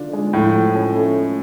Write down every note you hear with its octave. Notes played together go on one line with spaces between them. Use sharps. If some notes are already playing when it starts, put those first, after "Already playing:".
Already playing: D3 D4 F4
G#3
A2 F3
F3
C#4
A3